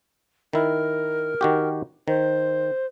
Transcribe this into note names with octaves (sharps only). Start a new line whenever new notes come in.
D#3 E4 A#4
D#3 F#4 G4
D#3 C5